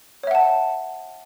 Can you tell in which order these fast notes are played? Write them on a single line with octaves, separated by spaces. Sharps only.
C#5 E5 F#5 A5